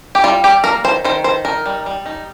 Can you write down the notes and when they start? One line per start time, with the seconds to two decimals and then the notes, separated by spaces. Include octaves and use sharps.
0.15 G4
0.24 G3 F4
0.44 G3 G4
0.64 A#3 A#4
0.84 D#3 C5
1.05 D#3 C5
1.24 D#3 C5
1.45 D#4 A#4
1.66 G3
1.86 G3
2.06 D#4